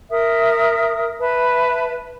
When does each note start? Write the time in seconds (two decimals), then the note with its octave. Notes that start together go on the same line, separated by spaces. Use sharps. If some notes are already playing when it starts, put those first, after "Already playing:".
0.10 A#4 E5 D#6
1.19 B4 E5 A5 B5